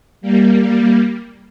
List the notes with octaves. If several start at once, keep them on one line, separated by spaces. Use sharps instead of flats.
G3 A#3
G3 A#3